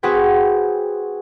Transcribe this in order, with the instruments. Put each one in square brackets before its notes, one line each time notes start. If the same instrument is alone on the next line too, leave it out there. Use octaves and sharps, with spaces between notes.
[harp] C4 F#4 G#4 B4 F#5 G5